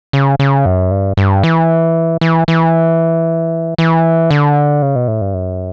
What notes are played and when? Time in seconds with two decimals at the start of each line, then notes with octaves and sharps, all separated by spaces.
0.13 C#3
0.39 C#3
0.66 F#2
0.91 G2
1.17 G2
1.43 E3
2.21 E3
2.48 E3
3.78 E3
4.31 D3
4.82 C#3
4.96 B2
5.08 A2
5.21 G2
5.34 F#2